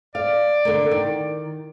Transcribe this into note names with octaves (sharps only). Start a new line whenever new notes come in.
D5 F5
D3 A#3
D#3